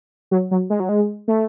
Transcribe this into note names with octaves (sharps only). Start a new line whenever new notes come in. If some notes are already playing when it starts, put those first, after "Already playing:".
F#3
F#3
G#3
F#3
G#3
A3